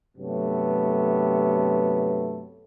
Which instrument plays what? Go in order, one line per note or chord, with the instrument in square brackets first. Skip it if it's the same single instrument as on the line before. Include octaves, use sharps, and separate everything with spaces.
[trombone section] G2 C3 F#3 A3 B3